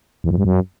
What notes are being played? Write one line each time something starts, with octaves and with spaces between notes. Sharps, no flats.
E2
F2
G2
F#2